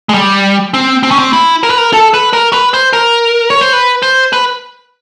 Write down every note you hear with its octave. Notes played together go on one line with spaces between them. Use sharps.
G#3
G3
C4
C4
C#4
C4
E4
A#4
B4
A#4
A4
B4
A#4
B4
C5
A#4
C#5
C5
B4
C5
B4